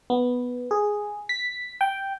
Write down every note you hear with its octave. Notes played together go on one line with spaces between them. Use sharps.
B3
G#4
B6
G5